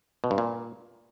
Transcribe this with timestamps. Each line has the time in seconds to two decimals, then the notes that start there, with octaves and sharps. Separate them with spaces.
0.24 B2
0.31 G2
0.38 A#2